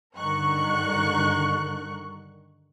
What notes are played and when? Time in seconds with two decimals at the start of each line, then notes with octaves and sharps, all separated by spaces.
0.17 G2 D3 D#3 A#4 C#6 F#6